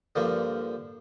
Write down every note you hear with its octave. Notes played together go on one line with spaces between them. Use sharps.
G2 D3 F3 A#3